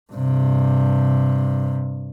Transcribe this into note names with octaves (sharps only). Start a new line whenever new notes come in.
G2 C3